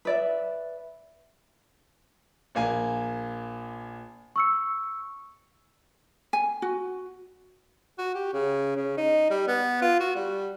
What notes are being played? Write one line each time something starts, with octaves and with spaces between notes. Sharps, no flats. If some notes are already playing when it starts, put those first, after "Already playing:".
B4 D5 E5
A#1 A#3 G#5
C#6 E6 C#7
G#5
F#4
F#4
G4
C#3
C#3
D#4
G3
B3
F4
F#4
G3